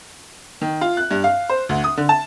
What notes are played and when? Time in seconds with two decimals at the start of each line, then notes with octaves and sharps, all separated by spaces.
0.62 D#3
0.81 F4
0.97 F#6
1.11 G2
1.24 F5
1.50 C5
1.69 D2
1.84 D#6
1.97 D3
2.09 A5